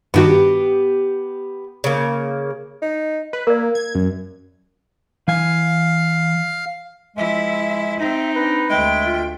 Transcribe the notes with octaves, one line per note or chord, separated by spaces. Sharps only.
G2 D#3 B3 F#4 G4
C#3 A#3
D#4
B4
A#3 A#4 D5
G#6
F#2
E3 F5 G#5
F3 G#3 E4 E5
C4 D#4
D4 B4
D2 G#3 E5 G5
F4